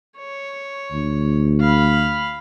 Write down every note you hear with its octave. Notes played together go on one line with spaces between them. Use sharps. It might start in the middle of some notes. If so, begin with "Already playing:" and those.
C#5
D2
F5 B5